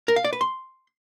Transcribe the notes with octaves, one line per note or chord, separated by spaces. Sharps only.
A#4
F5
D5
B4
C6